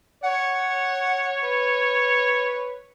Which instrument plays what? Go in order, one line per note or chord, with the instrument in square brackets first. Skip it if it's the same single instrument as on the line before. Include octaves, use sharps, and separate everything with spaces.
[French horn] C#5 [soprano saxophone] F#5
[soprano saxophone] B4